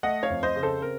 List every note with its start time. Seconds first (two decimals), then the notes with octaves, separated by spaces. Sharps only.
0.03 A3 D#5 F#5
0.23 C#5 F5
0.30 F2
0.43 C5 D#5
0.56 C#3
0.63 A4 C5
0.82 C4 A#4